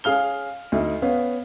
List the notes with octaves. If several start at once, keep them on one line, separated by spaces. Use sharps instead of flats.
C#4 G#4 F5 F6 G7
D2 D#4 E5
B3 C#4 F5